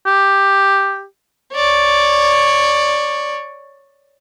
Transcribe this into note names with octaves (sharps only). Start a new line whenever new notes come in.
G4
C#5 D5